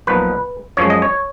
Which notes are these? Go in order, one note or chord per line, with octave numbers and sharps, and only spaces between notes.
B1 A#2 F3 B3 D#4 B4
F#2 F3 G#3 C#5
D#5
C#5